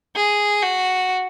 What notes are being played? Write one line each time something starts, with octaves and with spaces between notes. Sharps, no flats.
G#4
F#4